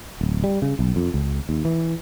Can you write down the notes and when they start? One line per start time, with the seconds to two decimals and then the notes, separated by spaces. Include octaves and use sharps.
0.21 D1
0.44 G3
0.62 C#3
0.79 B1
0.96 F2
1.14 C#2
1.49 D#2
1.65 E3